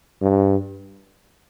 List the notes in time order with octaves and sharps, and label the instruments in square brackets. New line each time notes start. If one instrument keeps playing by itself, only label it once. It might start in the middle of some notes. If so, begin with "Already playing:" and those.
[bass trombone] G2